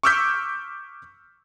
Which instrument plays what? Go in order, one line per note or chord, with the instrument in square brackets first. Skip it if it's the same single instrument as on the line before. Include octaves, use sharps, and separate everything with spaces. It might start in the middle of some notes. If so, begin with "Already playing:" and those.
[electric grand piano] C#6 D6 E6 F6 G6 B6